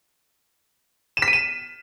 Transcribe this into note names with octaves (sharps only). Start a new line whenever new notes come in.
E7
B6
D#7
E7